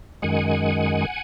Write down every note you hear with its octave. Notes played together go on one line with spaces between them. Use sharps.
F#2 D#3 G#3 F#5 G#5